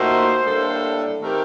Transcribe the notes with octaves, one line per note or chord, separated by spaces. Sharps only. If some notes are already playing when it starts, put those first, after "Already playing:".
Already playing: A#2 A3 D#4 F#4 C5
A2 G3 A#3 D4 A4
D#3 A3 C4 G4 A#4